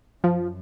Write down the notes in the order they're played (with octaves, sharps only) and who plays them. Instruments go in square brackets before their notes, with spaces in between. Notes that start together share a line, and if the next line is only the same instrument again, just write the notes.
[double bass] F#2 [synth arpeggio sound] F3